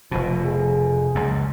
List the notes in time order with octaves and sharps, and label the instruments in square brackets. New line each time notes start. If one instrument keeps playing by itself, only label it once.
[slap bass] F1 B2 [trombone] F3
[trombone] G#4
[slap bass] C#2 F#2